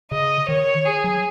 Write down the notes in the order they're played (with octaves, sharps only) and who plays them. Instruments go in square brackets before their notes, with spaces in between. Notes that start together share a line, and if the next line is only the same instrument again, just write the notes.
[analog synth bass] C#3 [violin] D#5
[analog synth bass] D#3 [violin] C#5
[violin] G#4
[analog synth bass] F#3